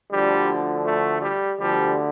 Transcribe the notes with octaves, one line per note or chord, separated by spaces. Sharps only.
D2 D3 F3 G3
A3
G3
D2 D3 F3 G3